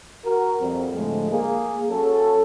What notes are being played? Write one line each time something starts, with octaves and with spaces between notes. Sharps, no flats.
F#4 A#4
F2 G3 C4
A2 D3 F3 G#3 A3
A#3 G#4
F#3 C#4 A4